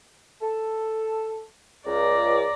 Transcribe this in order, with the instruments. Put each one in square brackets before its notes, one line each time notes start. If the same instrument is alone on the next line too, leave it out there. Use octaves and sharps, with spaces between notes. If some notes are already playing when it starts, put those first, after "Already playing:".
[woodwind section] A4
[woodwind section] C#2 [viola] D5 A#5